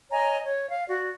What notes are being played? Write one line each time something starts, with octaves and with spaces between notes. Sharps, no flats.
C#5 D#5 G#5 A#5
C#5
F5
F#4 D5